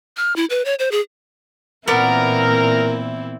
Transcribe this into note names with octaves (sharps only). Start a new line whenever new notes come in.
F6
E4
B4
C#5
C5
G#4
A#2 E3 B3 C4 E4 A#4 D5